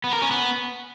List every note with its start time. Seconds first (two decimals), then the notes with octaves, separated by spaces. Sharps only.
0.04 B3
0.13 A#4
0.22 C#4
0.31 B3